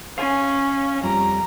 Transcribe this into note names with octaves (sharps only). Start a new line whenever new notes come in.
C#4 F5 G#5
F2 G3 A#5